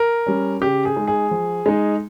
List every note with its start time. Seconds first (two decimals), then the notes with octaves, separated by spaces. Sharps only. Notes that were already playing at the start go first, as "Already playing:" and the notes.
Already playing: A#4
0.26 G3 C#4
0.61 C#3 G4
0.85 G#4
0.96 G#3 D#4
1.07 G#4
1.31 F3
1.66 G#3 D#4